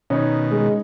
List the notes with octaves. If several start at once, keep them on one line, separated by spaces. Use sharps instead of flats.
B2 D#3 C#4 D#4 C#5
G#3